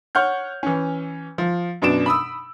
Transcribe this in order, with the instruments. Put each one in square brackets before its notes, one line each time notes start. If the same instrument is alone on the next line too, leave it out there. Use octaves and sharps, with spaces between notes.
[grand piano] C#5 F#5 F6 G6
E3 C#4
F3
F#2 B2 D4 D7 E7
B5 D#6 E6